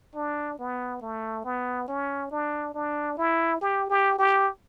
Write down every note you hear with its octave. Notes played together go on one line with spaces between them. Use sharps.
D4
B3
A3
B3
C#4
D4
D4
E4
G4
G4
G4